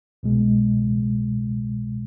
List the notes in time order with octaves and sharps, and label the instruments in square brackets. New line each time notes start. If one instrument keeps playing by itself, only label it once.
[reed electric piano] C2 B2 G#3